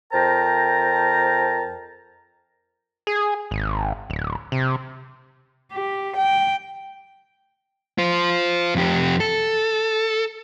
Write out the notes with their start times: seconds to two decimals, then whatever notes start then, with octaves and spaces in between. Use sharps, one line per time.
0.13 F2 A#4 C5 G5 A5 A#5
3.07 G#4
3.51 G#1
4.10 D1
4.52 C3
5.72 G4
6.17 G5
7.98 F4 C5
8.75 F2 G4
9.20 A4